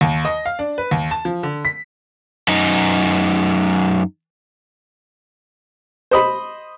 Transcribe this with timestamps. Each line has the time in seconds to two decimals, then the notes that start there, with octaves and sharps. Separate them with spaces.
0.01 D#2
0.25 D#5
0.46 F5
0.59 D4
0.78 B4
0.91 D#2
1.11 A5
1.25 F3
1.43 D3
1.65 B6
2.48 F#2 D#4
6.11 C5 D#5 B5